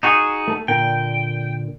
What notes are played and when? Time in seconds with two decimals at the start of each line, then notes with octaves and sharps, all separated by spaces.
0.03 D#4 F#4 G#4
0.48 A3 A4
0.68 A#2 D3 A#3 G5